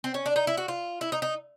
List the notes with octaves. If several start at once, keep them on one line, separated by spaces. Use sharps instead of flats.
C4
C#4
D4
D#4
E4
F#4
F4
E4
D#4
D#4